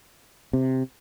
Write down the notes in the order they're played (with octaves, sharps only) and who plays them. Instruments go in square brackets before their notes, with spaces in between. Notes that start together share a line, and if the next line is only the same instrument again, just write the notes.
[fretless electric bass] C3